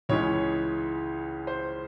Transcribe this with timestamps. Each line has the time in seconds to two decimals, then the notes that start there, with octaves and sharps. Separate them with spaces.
0.09 C#2 C#3 E3 G#3 C#5
1.47 C5